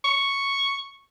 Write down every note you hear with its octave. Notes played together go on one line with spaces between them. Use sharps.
C#6